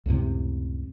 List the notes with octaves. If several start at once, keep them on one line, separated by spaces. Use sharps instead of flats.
C#2 F#2 A2 C3